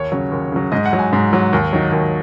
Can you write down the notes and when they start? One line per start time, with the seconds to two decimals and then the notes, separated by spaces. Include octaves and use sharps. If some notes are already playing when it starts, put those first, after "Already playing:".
Already playing: D#2 C#5
0.12 C#3 F#3
0.32 D#2
0.52 C#3 F#3
0.72 G#2 D#5
0.86 F#5
0.93 F#3
0.99 G#5
1.13 G#2
1.33 F#3
1.53 D#2
1.73 D#3 F#3
1.92 D#2